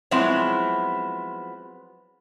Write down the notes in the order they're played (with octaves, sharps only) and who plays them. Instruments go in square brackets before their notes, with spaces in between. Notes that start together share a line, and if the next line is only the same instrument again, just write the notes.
[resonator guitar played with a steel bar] F3 F#3 G#3 B3 C4 E4